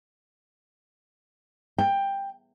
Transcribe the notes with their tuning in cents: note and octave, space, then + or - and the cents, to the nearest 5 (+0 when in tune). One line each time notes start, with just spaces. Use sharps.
G5 +15